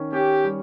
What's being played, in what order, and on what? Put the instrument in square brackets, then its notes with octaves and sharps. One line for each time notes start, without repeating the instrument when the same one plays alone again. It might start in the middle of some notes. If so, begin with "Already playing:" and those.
Already playing: [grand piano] D#3 C#4
[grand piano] C#4 [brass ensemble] G4
[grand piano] G3